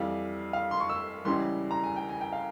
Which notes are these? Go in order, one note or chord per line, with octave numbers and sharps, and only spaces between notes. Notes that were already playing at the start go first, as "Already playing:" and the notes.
Already playing: F2 E3 G3 F5
F5
C6
C#6
E6
C#2 C#3 E3 G3 C6
A#5
G#5
G5
G#5
G5
F5